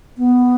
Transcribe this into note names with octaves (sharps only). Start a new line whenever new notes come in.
B3